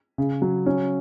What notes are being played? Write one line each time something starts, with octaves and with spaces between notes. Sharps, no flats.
C#3
F#3
C#4